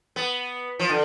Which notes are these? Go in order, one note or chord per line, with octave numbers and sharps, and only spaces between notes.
B3
F3
D3